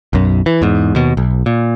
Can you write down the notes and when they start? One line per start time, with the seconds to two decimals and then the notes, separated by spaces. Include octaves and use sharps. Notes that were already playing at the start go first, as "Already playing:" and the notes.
0.13 B1 F#2
0.46 E3
0.62 E2 G#2
0.95 D#2 B2
1.17 B1
1.46 A#2